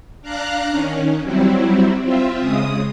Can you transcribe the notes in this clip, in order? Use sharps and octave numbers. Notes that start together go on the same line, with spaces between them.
D4 F5 A#5 F#6
D#3 C#4
F#3 G3 C4 E4
C4 F4 E5
C#3 G#3 D#6